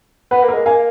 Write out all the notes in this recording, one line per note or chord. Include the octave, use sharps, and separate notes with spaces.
B3 B4
A#3
A#4
G#3
A#3 F5 G#5